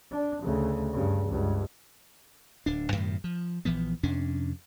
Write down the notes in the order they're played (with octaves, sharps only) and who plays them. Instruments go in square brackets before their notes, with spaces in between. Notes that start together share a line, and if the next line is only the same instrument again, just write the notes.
[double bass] D4
D2 C#3
G2 C#3
C#2 G2
[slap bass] D1 D4
F#2 A2 C3 D#3
F3
A#1 E3 F3 B3
F2 C3 C#4 D4